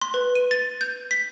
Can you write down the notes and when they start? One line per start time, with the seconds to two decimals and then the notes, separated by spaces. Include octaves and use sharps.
0.02 C6
0.14 B4
0.35 D#7
0.51 A6
0.81 G6
1.11 B6